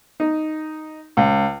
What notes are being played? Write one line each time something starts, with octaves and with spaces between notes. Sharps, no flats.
D#4
C#2